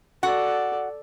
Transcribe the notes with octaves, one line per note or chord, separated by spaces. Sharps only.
F#4 A4 D5 F#5